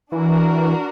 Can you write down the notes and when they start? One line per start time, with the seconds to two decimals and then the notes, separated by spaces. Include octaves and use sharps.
0.12 E3 D4 F#4 A#4